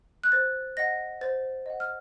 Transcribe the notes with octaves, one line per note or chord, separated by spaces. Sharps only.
F#6
C5 A6
D#5 F#5 A#6
C5 A6
D#5 F#5
F6